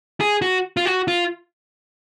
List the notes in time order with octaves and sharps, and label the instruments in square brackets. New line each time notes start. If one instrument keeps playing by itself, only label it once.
[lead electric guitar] G#4
F#4
F4
F#4
F4